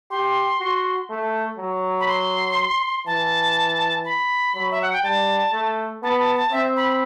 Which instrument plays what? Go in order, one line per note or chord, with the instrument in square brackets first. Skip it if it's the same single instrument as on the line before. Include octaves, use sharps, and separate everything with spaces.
[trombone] G4 [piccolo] C6
[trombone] F#4
A3
F#3
[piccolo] B5
C6
[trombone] E3 [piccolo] A5
[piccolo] B5
[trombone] F#3
[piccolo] E5
F#5
G5
[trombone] G3 [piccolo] A5
[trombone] A3
[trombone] B3 [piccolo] A5
[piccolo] B5
A5
A5
[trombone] C4 [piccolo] E5
[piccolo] B5
B5